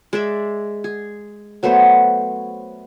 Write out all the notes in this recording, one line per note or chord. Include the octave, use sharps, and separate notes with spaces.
G#3 D5 E5
G#4
F#3 A3 B3 C5